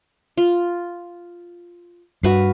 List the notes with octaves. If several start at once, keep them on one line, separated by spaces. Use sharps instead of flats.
F4
G2 F#4 B4 F5